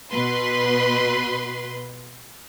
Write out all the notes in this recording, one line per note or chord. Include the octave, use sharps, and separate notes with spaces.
B2 B4 C6